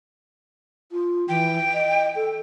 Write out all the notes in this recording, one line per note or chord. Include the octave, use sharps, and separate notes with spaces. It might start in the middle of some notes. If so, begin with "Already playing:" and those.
F4
E3 G5
D#5
A4